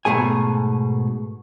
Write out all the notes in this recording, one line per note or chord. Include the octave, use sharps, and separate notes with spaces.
G#2 B2 A3 G#4 G#5